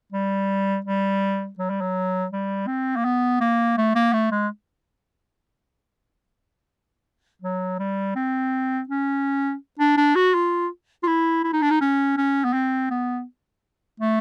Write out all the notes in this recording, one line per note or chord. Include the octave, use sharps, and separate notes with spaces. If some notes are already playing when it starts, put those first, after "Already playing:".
G3
G3
F#3
G3
F#3
G3
C4
A#3
B3
A#3
A3
A#3
A3
G#3
F#3
G3
C4
C#4
D4
D4
F#4
F4
F4
E4
E4
D#4
D4
D#4
C#4
C#4
B3
C4
B3
A3